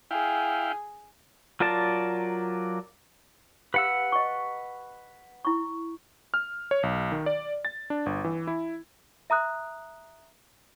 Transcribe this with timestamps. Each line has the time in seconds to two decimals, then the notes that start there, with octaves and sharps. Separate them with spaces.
0.11 E4 G#4 F5 G5
1.60 F#3 F4 A#4 D5 A5
3.74 G4 B4 F5 F#5 E6
4.12 D#5 C#6
5.45 E4 C#6
6.34 F6
6.71 C#5
6.83 B1
7.12 D#3
7.26 D5
7.65 A6
7.90 D4
8.06 G1
8.24 E3
8.47 E4
9.30 E5 A#5 D#6 F#6